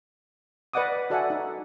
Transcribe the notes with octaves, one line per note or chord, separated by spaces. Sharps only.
B4 D5 D#5 F#5 D6 D#6
F#4 A4 D5 E5 F#5 G#5
D#4